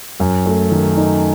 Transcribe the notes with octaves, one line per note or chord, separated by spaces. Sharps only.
F#2
A3
D#3
D#4